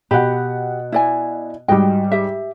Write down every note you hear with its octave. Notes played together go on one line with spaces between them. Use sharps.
B2 G4 F#5 B5
E4 D5 G#5
G#2 G3 F#4 D#5 G5
G4 E5